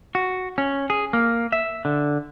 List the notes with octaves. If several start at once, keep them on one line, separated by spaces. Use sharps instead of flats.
F#4
C#4
G#4
A#3
E5
D3